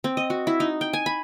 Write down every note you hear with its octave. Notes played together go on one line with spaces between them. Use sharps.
C4
D#5
F#4
E4
D#4
G5
G#5
B5